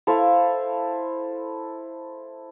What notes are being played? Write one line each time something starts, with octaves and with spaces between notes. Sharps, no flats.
E4 A4 C5 F5